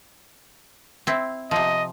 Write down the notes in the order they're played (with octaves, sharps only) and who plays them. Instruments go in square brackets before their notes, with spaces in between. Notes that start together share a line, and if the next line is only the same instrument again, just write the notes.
[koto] C4 E4
[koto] C3 F3 [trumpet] D#5